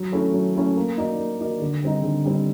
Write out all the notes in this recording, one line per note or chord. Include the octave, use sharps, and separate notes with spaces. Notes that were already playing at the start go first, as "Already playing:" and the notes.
Already playing: F#3
A3 C#4 E4 A4
F#3
A3 C#4 E4 A4
A#3
D#4 F#4 A#4 D5
A#3
D#4 F#4 A#4 D5
D3
G3 C4 D#4
D3
G3 C4 D#4